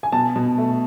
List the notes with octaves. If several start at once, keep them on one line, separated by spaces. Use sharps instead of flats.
G#5
B2 A5
B2
A3